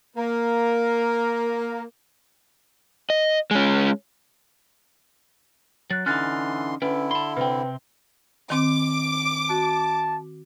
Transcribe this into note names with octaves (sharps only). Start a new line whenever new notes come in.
A#3 A#4
D#5
G#3 C#4
F#3 F#6 A6
D3 E3 C#4 D#4 C6 F6 F#6 A6
D3 C#4 E4 B4 G5
A5 B5 C6
C3 C4 B4 G5
D#3 C4 D6
F#4 A5